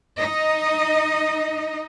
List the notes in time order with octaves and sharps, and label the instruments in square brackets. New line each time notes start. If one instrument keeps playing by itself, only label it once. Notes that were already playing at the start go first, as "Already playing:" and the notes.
[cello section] D#4 D#5